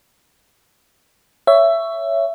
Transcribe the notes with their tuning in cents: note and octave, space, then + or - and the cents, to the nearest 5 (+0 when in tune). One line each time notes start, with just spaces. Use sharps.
C#5 +10 E5 +15